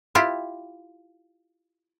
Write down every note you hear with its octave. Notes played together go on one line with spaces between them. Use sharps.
E4 F4 G4